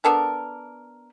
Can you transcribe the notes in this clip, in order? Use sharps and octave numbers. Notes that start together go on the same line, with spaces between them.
B3 D4 A4 A#4